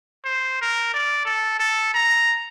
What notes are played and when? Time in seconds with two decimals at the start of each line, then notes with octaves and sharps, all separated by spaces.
0.25 C5
0.61 A#4
0.94 D5
1.25 A4
1.59 A4
1.94 A#5